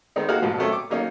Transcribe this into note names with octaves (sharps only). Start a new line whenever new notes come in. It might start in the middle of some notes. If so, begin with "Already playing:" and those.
D#3 G#3 B3 C4 D#4
A#3 D#4 F#4 G#4 F5 F#5
A1 G#2 B2 F3
D#3 F#3 A3 C4 C#4
D6
D#3 F#3 A#3 C#4 D#4